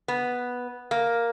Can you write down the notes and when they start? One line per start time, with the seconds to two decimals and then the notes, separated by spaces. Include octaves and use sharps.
0.08 B3
0.91 A#3